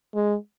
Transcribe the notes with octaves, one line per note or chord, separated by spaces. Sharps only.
G#3